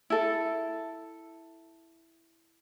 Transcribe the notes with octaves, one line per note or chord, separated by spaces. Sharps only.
E4 A4